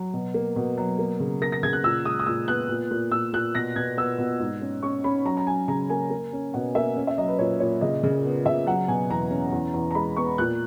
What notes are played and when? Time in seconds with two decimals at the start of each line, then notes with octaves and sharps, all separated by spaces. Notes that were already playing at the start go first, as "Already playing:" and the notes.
Already playing: F#3
0.14 B2
0.34 A#3
0.56 B2
0.78 F#3
0.99 A#3
1.20 C#3
1.41 A#3 A#6
1.52 A#6
1.63 C#3 G#6
1.73 F#6
1.84 A#2 E6
2.05 G#3 D#6
2.19 D#6
2.26 A#2 E6
2.48 B3 F#6
2.69 A#2
2.91 A#2
3.12 A#2 E6
3.33 A#2 F#6
3.55 B2 A#6
3.76 B2 G#6
3.97 B3 E6
4.18 B2
4.40 G#2
4.61 C#4
4.83 C#4 C#6
5.04 C#4 B5
5.25 F#3 A#5
5.37 A#5
5.47 F#3 G#5
5.68 C#3 A#5
5.90 A#3 G#5
6.10 A#3
6.33 C#4
6.54 B2 F#5
6.75 A#3 E5
6.96 C#4
7.07 E5
7.18 F#3 D#5
7.28 B4
7.39 A#2 C#5
7.60 A#2 C#5
7.81 C#3 D#5
8.03 C#3
8.25 B3
8.46 C#3 E5
8.67 F#3 F#5
8.88 B2 G#5
9.10 E2 A#5
9.31 C#4
9.52 E2
9.74 E2
9.91 A#5
9.95 G#3 B5
10.16 B3 C#6
10.38 A#2 F#6